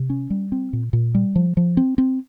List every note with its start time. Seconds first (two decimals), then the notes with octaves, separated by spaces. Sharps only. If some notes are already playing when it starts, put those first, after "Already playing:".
Already playing: C3
0.10 C#4
0.30 G3
0.52 C4
0.73 A#2
0.93 A#2
1.15 G3
1.36 F3
1.57 F3
1.77 C4
1.98 C4